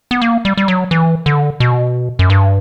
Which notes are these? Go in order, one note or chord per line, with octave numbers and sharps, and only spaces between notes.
B3
A#3
G3
G3
F#3
E3
D3
B2
F#2
G2